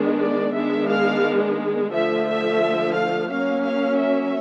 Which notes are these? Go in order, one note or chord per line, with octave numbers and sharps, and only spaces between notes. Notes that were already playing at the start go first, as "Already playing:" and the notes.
Already playing: D#3 G#3 B3 D4
D5
D#3 G#3 B3 D4 E5
F5
D3 F3 A3 E5
E5
F5
F#3 A#3 C#4 F5
F5
E5